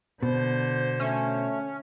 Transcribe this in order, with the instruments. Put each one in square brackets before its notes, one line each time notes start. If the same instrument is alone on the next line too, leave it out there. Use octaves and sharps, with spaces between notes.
[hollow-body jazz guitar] B2 [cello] D3 C5
[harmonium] A3 [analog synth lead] C#4